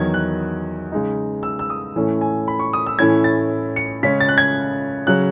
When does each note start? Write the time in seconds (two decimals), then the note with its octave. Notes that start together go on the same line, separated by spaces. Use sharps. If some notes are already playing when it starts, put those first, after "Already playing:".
Already playing: E2 D#3 F#3 G#6
0.14 F#6
0.92 C#3 G#3 D#4
1.43 E6
1.59 E6
1.70 D#6
1.96 A2 E3 A3 C#4
2.21 G#5
2.48 B5
2.59 C#6
2.73 D#6
2.86 E6
2.99 A2 E3 A3 C#4 E4 G#6
3.24 A6
3.76 C#7
4.03 C#3 G#3 C#4 B6
4.20 A6
4.29 F#6
4.38 G#6
5.07 C#3 F#3 F#6